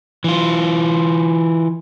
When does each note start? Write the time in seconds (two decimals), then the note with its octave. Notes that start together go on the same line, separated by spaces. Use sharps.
0.24 E3 F4